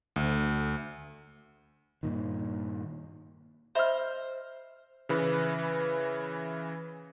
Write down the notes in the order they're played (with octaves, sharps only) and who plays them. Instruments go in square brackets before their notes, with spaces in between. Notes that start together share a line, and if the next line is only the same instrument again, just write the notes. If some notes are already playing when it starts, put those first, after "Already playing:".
[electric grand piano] D2
[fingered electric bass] G2 A#2 D#3
[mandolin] C5 F6 [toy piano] D#5 E5 B5
[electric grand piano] C#3 E3 B4